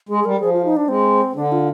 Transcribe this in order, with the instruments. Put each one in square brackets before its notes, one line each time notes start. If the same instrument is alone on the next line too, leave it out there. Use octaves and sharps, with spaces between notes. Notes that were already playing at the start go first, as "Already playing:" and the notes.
[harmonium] G#3 [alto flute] G#4
[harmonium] G3 [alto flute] A#4
[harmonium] F3 [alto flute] G#4
[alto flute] F4
D#4
D4
[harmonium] G#3 [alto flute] C4
[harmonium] D3 [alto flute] D4
[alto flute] F4